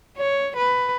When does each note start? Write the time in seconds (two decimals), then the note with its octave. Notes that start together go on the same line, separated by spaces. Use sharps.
0.17 C#5
0.56 B4